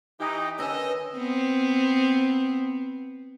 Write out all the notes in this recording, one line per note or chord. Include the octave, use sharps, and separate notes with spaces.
E3 D#4 G4
D3 D#3 C#4 B4 D#5 G#5 E6
B3 C4